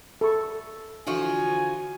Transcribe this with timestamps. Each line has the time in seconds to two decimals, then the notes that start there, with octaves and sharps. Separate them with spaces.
0.21 A4 C#6
1.07 D3 E3 F3 F4 F#4 G#5